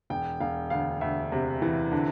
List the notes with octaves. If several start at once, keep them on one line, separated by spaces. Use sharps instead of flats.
E1 G5
E1 F5
D2 F5
D2 E5
C3
E3
D3